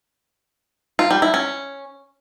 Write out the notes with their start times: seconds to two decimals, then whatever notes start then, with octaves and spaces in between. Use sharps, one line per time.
0.99 F4
1.11 G3
1.22 E4
1.34 C#4